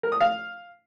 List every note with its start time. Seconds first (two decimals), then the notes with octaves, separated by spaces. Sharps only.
0.03 A#4
0.12 D#6
0.20 F5